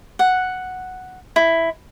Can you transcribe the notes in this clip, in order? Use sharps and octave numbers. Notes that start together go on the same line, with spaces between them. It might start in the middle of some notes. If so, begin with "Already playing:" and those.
F#5
E4